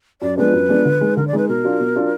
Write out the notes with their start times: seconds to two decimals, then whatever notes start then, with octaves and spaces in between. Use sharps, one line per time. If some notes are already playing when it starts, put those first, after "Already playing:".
0.22 F#2 D5
0.37 F3 G#3 B3 D4 B4
0.53 F#2
0.69 F3 G#3 B3 D4
0.85 D3
1.01 G#3 D#4
1.17 D3 A#4
1.28 D5
1.33 G#3 D#4 B4
1.48 B2 A#4
1.64 F#3 D4 F4
1.79 B2
1.96 F#3 D4 F4